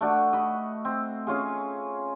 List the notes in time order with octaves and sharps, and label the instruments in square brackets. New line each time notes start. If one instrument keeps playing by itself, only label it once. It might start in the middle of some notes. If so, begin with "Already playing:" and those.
[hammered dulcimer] A3 D4 F#4
D#5 B5
C4
C#4 F4 G#4